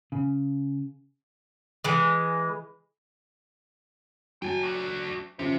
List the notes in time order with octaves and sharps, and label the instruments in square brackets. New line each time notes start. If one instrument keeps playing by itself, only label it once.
[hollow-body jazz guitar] C#3
[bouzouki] E3 G#3
[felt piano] F#3 [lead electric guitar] G5 G#5
[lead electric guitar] D4 F#4
[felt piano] C#3 F3 [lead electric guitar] C5 E5